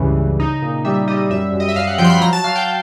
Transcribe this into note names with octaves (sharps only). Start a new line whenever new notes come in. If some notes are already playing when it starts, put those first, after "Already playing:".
Already playing: C#2 G2 C#3 E3
C#3
D#4
A#2
G3 E5
G3 D#5
F#2 E5
F#2
D#5
E5
F#2 F5
F#5
F3 G5
C6
B5
F#3 A#5
A5
F#3 F5
G5